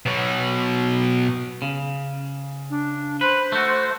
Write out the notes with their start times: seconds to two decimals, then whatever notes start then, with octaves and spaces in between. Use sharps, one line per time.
0.06 B2 F#3
1.62 C#3
2.70 D4
3.21 B4 C5
3.52 A3 F#4